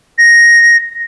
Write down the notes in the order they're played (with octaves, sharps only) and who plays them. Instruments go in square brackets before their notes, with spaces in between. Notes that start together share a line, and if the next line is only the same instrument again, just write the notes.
[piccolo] A#6